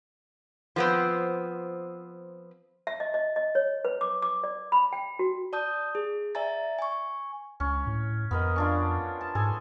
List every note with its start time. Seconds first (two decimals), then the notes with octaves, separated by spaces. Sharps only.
0.76 F3 B3 C4
2.87 E5
3.00 D#5
3.14 D#5
3.36 D#5
3.55 C#5
3.85 B4
4.01 D6
4.22 D6
4.44 D5
4.72 B5
4.93 G5
5.19 F#4
5.53 D5 A5 D#6 G6
5.95 G#4
6.35 D5 E5 G#5 A#5 A6
6.79 G#5 C#6
7.60 C#2 C#4
7.87 A2
8.31 F2 B3 A#4 D#5
8.56 C#4 D4 F4
9.21 A5
9.35 G#2 G#4 A4 G#5